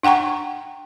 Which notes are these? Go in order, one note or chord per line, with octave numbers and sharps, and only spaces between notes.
D4 F#5 G5 A#5 C#6